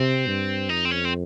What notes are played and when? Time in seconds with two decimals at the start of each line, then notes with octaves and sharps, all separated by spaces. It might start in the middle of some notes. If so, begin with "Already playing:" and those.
Already playing: C3 C4
0.27 G2
0.69 F2 D#4
0.85 C4
0.91 C#4
1.05 C4